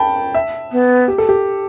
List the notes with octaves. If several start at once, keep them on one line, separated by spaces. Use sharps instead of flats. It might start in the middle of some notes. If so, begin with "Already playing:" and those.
Already playing: G5 A5 B5
E5
B3
G4
A4
G4